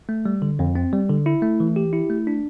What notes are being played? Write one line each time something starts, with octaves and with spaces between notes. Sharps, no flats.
A3
G3
D3
F2
C4
G3
D3
E4
A3
E3
G4
E4
A3
D4